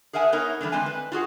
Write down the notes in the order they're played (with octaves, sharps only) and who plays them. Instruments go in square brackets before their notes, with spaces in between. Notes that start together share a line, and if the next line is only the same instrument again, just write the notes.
[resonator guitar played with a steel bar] G#4 A#4 E5 F#5 G#5
B3 D#4 A#4 C#5
D3 E3 G3 A3
D3 G#3 C4 G#5
B4
F4 F#4 G#4 F#5